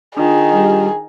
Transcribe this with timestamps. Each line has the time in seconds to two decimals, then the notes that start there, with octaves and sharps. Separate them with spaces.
0.17 D#3 D4 F4 G#4
0.52 G3